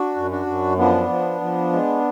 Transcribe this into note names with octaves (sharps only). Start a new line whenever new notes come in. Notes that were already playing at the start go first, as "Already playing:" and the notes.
Already playing: D4 F#4
F#2
D4 F#4
F#2
F3 B3 D4
F3
F3
G#3